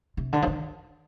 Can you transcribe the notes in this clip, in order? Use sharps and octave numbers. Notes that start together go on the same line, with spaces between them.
C3
D3
F3
D#3